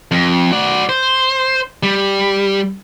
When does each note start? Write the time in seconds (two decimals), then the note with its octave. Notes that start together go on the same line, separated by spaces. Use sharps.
0.12 F2
0.52 F#4 D5
0.89 C5
1.83 G3